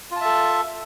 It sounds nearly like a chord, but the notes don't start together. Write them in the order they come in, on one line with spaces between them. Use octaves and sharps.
F4 A5 E5 A4